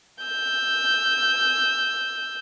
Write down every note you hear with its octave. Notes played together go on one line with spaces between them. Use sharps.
E6 G6